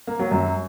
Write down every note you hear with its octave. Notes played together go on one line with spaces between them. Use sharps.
A#3
F#3
F#2